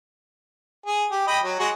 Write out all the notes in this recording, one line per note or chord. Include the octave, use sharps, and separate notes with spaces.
G#4
G4
D#5 G5 B5
F#3
G#3 F#4 G#4